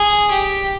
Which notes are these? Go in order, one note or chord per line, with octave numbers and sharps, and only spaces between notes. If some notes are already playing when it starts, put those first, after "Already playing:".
Already playing: G#4
G4